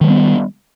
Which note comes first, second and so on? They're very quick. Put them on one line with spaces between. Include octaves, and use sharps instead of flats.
D#3 F#3 G3 B3